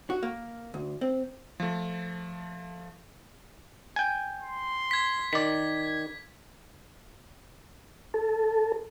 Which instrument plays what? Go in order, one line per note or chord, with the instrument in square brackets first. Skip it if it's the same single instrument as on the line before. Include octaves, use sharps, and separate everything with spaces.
[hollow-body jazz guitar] F#4
A#3
D2
C4
[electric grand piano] F3 A3
[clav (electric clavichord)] G5 G#5
[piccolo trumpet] C6
[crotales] G#6 B6
[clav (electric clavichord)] D#3 D5 [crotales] B6
[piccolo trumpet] G#6
[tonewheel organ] A4